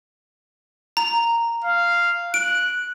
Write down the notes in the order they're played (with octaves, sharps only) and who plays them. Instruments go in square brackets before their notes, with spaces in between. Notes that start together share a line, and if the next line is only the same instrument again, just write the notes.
[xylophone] A#5
[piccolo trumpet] F5
[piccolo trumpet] F#6 [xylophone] D7